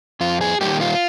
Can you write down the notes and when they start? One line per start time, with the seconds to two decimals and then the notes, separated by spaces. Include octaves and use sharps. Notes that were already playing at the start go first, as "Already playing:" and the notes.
0.21 F2 F4
0.41 G#4
0.61 D#3 G3 A#3 G4
0.81 F4